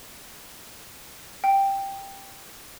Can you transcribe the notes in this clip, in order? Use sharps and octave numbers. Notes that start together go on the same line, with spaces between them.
G5